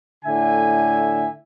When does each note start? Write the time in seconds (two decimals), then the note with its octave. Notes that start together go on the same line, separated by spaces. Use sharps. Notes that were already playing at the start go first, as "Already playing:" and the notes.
0.25 A2 D3 E5 G#5